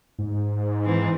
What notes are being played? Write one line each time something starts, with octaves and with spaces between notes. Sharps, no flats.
G#2
E3 C4